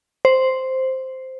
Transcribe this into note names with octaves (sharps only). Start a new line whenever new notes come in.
C5